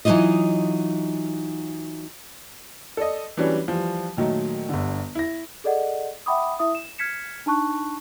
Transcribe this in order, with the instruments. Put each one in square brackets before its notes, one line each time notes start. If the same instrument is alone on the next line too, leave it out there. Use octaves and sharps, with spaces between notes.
[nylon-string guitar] E3 F#3 A3 D#4 F4 D#5
[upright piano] A4 D5 D#5
E3 F#3 G3 C#4 D4
E3 F3 G3
A#2 D#3 F#3 A3
G1 D3
E4 A#6
[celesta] G#4 A4 D5 D#5 F#5
E5 F#5 G5 B5 D6 D#6
E4 E5 D#6
E7
F6 G#6 B6 C#7 E7
D4 D#4 A5 C#6 F#6